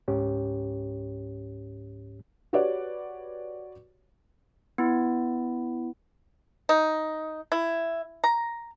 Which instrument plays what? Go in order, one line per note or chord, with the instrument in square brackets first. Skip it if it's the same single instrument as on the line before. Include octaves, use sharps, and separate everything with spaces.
[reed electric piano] C#2 G#2 C#4 G4 C#5
[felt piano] F#4 G4 B4 C#5 D5 F#5
[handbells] B3 E4
[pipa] D#4
E4
A#5